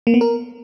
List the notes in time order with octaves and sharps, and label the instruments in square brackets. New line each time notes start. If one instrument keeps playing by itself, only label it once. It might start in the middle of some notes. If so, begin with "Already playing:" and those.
[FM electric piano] A#3
B3
A#4